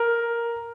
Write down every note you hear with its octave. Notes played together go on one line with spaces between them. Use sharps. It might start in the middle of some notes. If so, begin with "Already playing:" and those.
Already playing: A#4